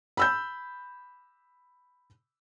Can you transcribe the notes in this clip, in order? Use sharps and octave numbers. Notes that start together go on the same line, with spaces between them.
B5 E6 G6